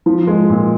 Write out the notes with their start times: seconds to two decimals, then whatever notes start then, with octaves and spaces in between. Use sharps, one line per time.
0.06 F3
0.27 G#3
0.50 A#2